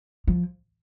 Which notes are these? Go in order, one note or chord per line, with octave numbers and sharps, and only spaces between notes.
F3